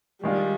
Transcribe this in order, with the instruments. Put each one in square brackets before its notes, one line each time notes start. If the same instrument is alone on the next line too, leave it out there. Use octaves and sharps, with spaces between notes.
[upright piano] D#3 G#3 D4 F4 [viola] G3